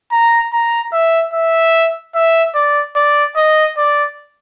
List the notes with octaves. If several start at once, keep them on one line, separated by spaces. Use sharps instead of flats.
A#5
A#5
E5
E5
E5
D5
D5
D#5
D5